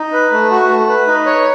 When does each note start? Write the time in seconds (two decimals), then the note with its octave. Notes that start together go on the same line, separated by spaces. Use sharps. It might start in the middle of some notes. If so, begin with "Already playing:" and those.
Already playing: D#4
0.13 B4
0.32 A3
0.51 F#4
0.69 A3
0.88 B4
1.07 D#4
1.26 C#5